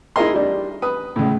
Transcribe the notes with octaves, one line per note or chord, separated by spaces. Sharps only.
D#4 E4 G#4 A#4 D#5 C6
G3 D4
B4 D#6
C#2 A2